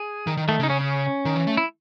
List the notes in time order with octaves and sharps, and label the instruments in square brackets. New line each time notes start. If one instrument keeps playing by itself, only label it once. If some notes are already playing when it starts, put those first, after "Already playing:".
Already playing: [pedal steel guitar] G#4
[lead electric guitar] D#3
D#3
[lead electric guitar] D#3 [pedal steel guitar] A3
[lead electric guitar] C#3 [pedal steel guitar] D#4
[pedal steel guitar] C#4
C#4
[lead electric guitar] D#3
E3
A3
[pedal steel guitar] E4